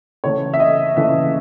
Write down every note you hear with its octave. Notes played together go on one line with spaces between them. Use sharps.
C#3 E3 A3 C#5
E5
D#5
C#3 E3 A3 E5